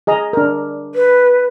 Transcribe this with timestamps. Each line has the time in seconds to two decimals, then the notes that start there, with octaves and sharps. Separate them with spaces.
0.07 G#4 D#5 A#5
0.33 D4 A#4
0.95 B4